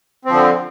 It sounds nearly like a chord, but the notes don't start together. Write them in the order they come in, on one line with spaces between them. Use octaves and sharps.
C4 F3 D3